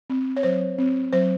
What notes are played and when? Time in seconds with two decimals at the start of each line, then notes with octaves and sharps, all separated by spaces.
0.10 C4
0.37 C#5
0.43 F#3 C5
0.78 C4
1.13 F#3 C5